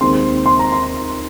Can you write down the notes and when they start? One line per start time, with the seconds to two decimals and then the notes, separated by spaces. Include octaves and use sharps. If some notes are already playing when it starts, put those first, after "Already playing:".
0.01 D#2 D#3 G#3 C4 C6
0.46 C6
0.59 A#5
0.72 C6